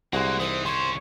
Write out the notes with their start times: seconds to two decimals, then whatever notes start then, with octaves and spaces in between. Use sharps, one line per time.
0.13 C2 G#3 A#3 F#4 G#4 F#6
0.40 E3 D#4 C5
0.66 D#3 C#4 C5 C#6